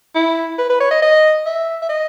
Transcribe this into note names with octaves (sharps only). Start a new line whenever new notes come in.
E4
B4
B4
C#5
D#5
D#5
E5
E5
D#5